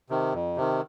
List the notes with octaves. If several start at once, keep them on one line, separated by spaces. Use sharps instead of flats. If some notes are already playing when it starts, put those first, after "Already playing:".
C3 D#3
F2
C3 D#3